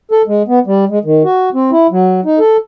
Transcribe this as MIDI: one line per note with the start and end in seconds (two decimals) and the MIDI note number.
0.12 0.22 69
0.27 0.43 56
0.48 0.59 59
0.66 0.85 55
0.90 0.99 56
1.05 1.23 51
1.24 1.49 66
1.54 1.71 60
1.72 1.87 64
1.91 2.20 54
2.25 2.39 63
2.39 2.57 69